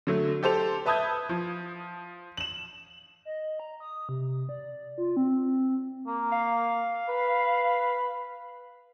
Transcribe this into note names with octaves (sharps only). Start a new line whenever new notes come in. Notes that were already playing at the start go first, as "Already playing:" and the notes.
D3 F#3 A3
G4 A4 C5 F7
B4 E5 A5 D#6 G6 G#6
F3
E7 F#7
D#5
A#5
D#6
C3
D5
F4
C4
A#3
F5
B4